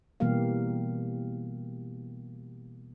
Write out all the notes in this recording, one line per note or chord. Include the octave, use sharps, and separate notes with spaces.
B2 E3 G3 A#3 G4 F5